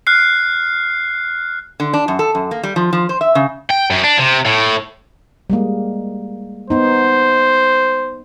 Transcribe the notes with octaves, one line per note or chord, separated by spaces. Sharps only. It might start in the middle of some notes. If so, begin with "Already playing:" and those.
F6 F#6 C7
D3
D4
F#2
A4
F#2
A#3
G3
F3
F3
C5
E5
C#3
G5
F#2
D4
C3
A2
G3 G#3 A#3
B3 D#4 C5